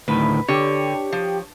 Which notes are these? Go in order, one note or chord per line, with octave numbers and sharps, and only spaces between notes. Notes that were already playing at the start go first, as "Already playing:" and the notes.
D2 A2 D#3 B4
D3 G4 C#5
F3